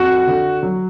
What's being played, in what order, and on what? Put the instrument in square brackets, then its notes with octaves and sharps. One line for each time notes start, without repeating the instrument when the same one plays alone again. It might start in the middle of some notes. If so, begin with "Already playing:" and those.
Already playing: [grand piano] F2 F#4
D3
F#3